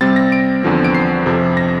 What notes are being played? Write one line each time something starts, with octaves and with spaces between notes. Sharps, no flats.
C3 G3 C4 A6
A#6
D7
E2 D3 F3 C4
D7
C7
F2 C3 F3
A#6